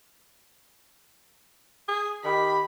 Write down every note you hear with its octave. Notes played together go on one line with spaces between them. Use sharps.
G#4
D#3 G4 B5